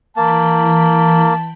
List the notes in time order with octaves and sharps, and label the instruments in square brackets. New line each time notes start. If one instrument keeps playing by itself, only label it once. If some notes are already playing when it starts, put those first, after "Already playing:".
[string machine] E3 G5 B5 [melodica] A#3 [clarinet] A5